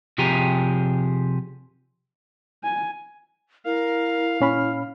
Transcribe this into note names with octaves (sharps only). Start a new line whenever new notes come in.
C3 F3 G4 G#4 A#5
G#5
E4 A#4 F5
A#2 C#4 B5 F6